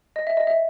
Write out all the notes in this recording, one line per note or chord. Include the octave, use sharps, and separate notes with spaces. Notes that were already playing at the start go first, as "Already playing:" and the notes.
D#5
E5
D#5
E5